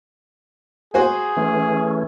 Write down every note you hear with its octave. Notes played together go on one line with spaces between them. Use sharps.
F#4 G#4 C5 G#5
E3 A3 C#4